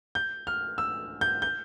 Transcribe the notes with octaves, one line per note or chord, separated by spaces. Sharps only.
G6
F6
E6
G6
G6